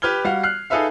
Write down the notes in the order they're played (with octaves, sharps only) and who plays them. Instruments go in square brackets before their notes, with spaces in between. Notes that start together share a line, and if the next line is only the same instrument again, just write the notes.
[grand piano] G4 B4 F6 G#6 G7
G3 F#4 F5
F6 F#6 C7
D#4 G#4 A4 B4 E5 F5